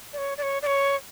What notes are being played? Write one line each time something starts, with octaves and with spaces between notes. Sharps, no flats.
D5
C#5
D5
C#5
D5
C#5